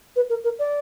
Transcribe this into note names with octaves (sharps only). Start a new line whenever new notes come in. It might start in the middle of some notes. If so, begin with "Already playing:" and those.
B4
A#4
A#4
D5